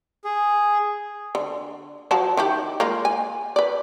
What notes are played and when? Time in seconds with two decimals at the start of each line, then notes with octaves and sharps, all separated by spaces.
0.25 G#4
1.35 D3
2.11 F3 F#3 A5
2.37 D#3 E4 G4
2.80 G#3 A#3 F4
3.05 G#5
3.56 B4 D5